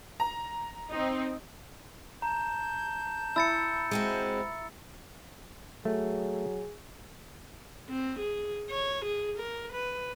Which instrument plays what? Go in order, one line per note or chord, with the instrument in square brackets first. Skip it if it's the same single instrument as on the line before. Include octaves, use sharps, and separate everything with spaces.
[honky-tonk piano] A#5
[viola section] C4 D#4
[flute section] A5 G6 [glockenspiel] A#5
[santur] E4 [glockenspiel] E6 A6 C#7
[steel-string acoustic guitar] G#3 C4 F#4
[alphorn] F#3 [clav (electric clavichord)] A3 [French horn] G#4
[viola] C4
G#4
C#5
G#4
A#4
B4